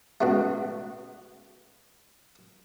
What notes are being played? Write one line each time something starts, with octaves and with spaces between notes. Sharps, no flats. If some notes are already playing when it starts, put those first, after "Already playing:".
C#2 B2 A3